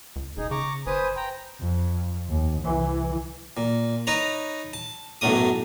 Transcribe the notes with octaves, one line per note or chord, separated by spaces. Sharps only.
C#2
E1 D#4 G#4
C#3 A#5 C#6 D6
G1 B4 C5 G#5 D#6
G5 A#5
F2
D#2
C2 E3
A#2
D#4 B4 C#5 A#5
A5
B1 F#2 A2 F#3 A3 D#6